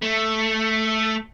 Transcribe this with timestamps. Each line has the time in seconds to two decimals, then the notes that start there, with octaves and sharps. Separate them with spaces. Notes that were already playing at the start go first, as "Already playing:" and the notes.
0.02 A3